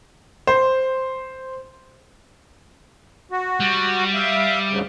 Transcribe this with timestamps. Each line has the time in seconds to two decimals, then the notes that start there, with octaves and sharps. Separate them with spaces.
0.47 C5
3.31 F#4
3.60 G3
4.15 E5 F5
4.70 D2 G#2 C#3